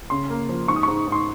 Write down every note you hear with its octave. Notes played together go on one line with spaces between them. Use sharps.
C#3 C6
A#3
F3
G#2 C#6
D#6
G#2 C#6
G#2
C6